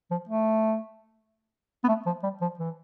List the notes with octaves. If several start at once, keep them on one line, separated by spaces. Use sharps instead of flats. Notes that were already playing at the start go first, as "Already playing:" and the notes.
F3
A3
B3
A3
F3
G3
F3
E3